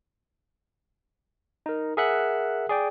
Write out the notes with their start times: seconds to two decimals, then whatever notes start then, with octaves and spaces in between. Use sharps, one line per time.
1.66 D#4 A#4
1.97 G#4 A#4 E5 F#5 F#6
2.69 G#4 D5 G5